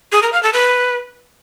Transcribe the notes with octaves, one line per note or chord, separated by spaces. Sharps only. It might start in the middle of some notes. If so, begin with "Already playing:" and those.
G#4
A#4
F5
A4
B4